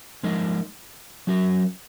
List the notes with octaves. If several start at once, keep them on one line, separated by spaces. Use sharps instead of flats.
F3 G#3 D#4 A#4 D#5
F#3 C#4 F#4 A#4